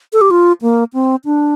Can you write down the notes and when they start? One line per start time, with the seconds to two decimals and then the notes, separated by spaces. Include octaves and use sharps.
0.13 A4
0.21 G4
0.30 F4
0.62 A#3
0.94 C4
1.25 D4